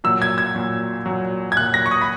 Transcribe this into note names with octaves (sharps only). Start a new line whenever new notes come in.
A#2 F#3 E6
G#6
G#6
A#2 F#3
A#2 F#3
G#6
A#2 F#3 F#6
A#6
C#6
D#6
B5